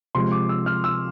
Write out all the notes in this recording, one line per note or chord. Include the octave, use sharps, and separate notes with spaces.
C3 F3 G#3 C6
D6
E6
F6
E6